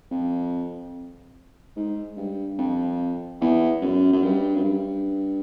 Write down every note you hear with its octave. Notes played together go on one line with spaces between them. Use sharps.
F2
G#2
G2
F2
E2
F#2
F#2
G2
F#2
G2